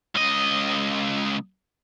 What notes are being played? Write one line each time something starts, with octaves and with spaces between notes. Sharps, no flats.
C#2 D#5